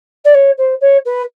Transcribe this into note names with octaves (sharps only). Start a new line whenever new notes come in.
D5
C#5
C5
C#5
B4